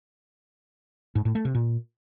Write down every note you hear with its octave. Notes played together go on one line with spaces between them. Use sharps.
G#2
A2
A3
C3
A#2